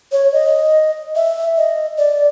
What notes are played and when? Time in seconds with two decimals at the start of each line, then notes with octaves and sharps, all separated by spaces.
0.12 C#5
0.33 D#5
1.16 E5
1.57 D#5
1.98 D5